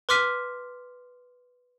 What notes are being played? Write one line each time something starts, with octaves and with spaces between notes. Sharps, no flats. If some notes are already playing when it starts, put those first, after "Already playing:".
B4 C6 D6 F6 B6 D#7